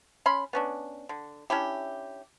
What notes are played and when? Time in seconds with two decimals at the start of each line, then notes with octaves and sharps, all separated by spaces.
0.26 C#4 B5 C6
0.53 B3 C#4 D4
1.09 D3
1.50 C#4 D4 E4 G4